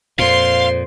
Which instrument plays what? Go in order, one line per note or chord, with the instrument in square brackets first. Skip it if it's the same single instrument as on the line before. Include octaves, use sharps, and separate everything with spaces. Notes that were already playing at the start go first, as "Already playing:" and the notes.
[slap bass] F2 A#2 [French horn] C5 [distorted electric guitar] F5 [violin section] C6